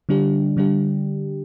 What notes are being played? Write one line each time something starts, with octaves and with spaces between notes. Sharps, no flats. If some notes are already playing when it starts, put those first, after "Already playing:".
D3 G3 D4 G4
D3 G3 D4 G4